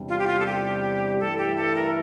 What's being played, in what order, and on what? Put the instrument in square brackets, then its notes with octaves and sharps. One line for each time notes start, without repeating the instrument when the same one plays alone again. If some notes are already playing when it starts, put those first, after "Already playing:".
Already playing: [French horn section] E2 C3 G3 D4
[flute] F4
G4
F4
A4
G4
[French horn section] G2 E3 A3 E4 [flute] A4
[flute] G4
A4
A#4